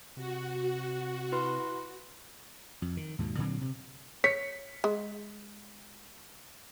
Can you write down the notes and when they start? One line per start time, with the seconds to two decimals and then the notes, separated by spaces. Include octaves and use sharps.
0.17 C3 F#4
1.32 E4 B4 C6
2.82 F2
2.97 D#3
3.19 D#2 G#2 B2
3.38 A#2 D3 F#3 C4
3.61 C3
4.24 C#5 B6 C#7
4.84 G#3